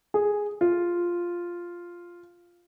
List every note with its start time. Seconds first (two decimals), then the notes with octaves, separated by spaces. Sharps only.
0.14 G#4
0.61 F4